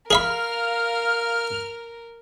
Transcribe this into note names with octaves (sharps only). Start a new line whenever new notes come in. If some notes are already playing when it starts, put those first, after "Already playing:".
G#4 A#4 E5 F5 B5 F6